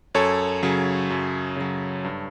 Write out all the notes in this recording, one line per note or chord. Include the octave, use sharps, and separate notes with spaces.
F#2 A4 C#5
C#3 F#3
F#2
C#3 F#3
G2